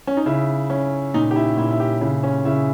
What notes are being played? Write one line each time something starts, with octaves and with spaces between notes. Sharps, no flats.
C#4
D#4
C#3 E4
C#4
A#2 D#4
G4
E4
A#2 E4
E4
G4
C#3 E4
C#4
C#3 E4